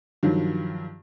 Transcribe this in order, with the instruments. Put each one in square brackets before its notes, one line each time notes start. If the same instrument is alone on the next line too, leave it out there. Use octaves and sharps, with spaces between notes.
[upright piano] G2 D#3 F3 F#3